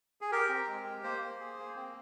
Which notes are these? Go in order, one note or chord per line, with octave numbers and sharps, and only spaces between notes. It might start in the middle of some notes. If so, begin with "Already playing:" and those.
G#4
G4 A#4
C4
G#3
G4
A#3 C5
A#3
G#4
A#3
C4